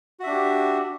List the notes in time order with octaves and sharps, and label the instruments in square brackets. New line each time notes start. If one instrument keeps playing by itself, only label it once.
[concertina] F#4
E5
D4
G4